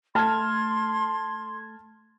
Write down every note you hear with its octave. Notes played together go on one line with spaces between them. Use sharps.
A3 A5 C6 F6 G#6